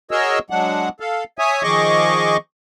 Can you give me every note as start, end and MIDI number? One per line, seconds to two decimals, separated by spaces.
0.11 0.39 66
0.11 0.39 68
0.11 0.39 70
0.11 0.39 73
0.11 0.39 75
0.11 0.39 88
0.50 0.89 54
0.50 0.89 56
0.50 0.89 62
0.50 0.89 78
1.00 1.24 69
1.00 1.24 77
1.39 1.63 73
1.39 1.63 76
1.39 1.63 80
1.39 1.63 87
1.63 2.37 51
1.63 2.37 53
1.63 2.37 68
1.63 2.37 75
1.63 2.37 85
1.63 2.37 86